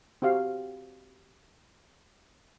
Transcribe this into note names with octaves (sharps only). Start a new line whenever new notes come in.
C4 F#4 G4 F5